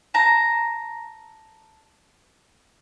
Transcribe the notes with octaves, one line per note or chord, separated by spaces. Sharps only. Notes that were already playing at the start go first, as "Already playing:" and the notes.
A5 A#5